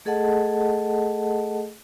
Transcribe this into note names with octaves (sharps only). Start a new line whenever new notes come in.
A3 G#4 A4 D#5 F#5 A5